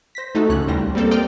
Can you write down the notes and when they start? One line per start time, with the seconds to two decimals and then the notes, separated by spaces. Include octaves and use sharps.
0.15 C5 A#6 B6
0.35 A3 D#4 F#4 A4
0.49 C#2 F#2 C#4 F#6
0.67 A1 D#2 G3 C5 A#6
0.95 G3 A#3 C4 A4 A#4
1.11 C5 D5 D#5 G5 F6 G6